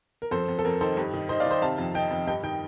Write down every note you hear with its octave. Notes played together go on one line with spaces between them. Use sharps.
A#4
F2 A4 C5
F2
A4
F2 A#4
D#3 A4 C5
G2
D#3
D#3 C5 D#5
D5 F5
D#3 C5 D#5
C3 F5 A5
F2
D#3 D#5 G5
F2
G2 D#5 G5
D#3 D#5 G5